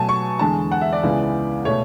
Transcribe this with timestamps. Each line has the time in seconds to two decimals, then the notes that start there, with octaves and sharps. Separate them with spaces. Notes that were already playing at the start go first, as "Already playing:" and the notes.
Already playing: B2 F#3 A3 G#5 A5
0.09 C#6
0.39 E2 D3 G#3 A5
0.71 F#5
0.81 E5
0.93 D5
1.03 C#2 C#3 E3 G#3 B3
1.65 B2 A3 C#5